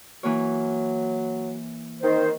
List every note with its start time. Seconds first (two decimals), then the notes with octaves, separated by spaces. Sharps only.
0.23 E3 F#3 A#3 C#5
2.03 D#3 C4 C5